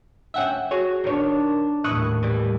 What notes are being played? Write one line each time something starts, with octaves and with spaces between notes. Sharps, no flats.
D2 C#4 E5 F#5 G5
F#4 G#4 C#5
D#3 D4 C#5
D#2 A2 E4 C#6 D#6 F#6
E3 G3